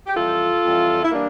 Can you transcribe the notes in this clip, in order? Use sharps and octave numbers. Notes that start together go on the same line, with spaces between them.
G4
F2 E3 G3 F4 A4
F2 E3 G3
E4
E3 G3 A#3 D4